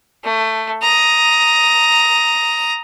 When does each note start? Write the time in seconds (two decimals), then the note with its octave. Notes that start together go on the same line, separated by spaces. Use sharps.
0.24 A3
0.82 A#5 D#6